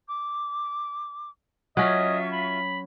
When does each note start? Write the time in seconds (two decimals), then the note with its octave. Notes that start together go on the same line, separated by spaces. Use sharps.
0.06 D6
1.77 F#3 C#4 F4 D#5 E5 C#6
2.32 B5